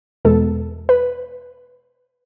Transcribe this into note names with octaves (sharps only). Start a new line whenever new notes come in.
E2 B2 G#3 B3 A4
B4